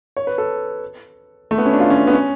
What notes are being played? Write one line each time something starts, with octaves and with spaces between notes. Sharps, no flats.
C#5
B4
A4
A3
B3
C#4
D4
F4
C#4
D4
B3
C#4